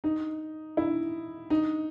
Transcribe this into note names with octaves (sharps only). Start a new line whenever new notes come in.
D#4
E4
D#4